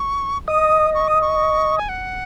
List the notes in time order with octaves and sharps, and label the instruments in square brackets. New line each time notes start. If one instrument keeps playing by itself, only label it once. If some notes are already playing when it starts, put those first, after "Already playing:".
Already playing: [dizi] C#6
[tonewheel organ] D#5 [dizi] D#6
[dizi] C#6
D#6
C#6
G#5
F#5